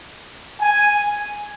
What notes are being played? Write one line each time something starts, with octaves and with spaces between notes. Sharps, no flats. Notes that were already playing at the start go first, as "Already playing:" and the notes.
G#5